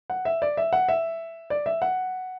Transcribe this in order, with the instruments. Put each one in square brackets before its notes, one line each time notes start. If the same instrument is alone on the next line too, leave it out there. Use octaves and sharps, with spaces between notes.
[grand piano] F#5
E5
D5
E5
F#5
E5
D5
E5
F#5